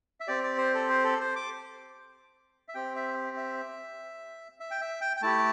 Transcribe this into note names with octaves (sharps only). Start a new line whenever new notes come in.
E5
C4 G4 D5
D5
C5
A4
C5
A4
C5
D6
E5
C4 G4 G5
E5
E5
E5
G5
E5
G5
G5
A3 E4 G4 A5